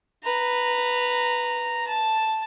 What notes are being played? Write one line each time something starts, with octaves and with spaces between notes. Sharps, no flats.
B4 A#5
A5